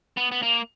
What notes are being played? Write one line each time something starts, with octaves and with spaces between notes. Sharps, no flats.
B3
B3
A#3